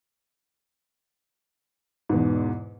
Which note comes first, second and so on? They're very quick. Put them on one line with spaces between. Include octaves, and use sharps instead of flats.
G#2 B2 E2